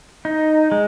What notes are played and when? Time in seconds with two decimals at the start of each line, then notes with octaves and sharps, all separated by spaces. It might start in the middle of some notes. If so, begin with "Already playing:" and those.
0.25 D#4
0.72 G#3